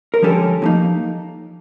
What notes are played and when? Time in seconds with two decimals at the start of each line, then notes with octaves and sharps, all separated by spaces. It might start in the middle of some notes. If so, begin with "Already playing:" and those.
0.14 A#4
0.22 D3 F3 G#3 C#4 G4 A4
0.62 A2 F3 A#3 D#4